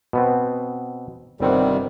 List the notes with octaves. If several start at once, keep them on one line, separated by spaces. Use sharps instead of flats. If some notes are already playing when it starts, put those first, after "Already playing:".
B2 B3 C4
G1 C3 D#3 G3 C4 F#5